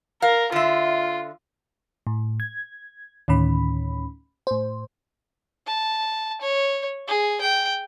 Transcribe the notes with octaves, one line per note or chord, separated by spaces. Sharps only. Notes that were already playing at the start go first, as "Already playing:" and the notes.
A#4 F5
D3 F4 E5
A2
G#6
D2 A2 D#3 C#4 B5
A2 C5
A5
C#5
G#4
G5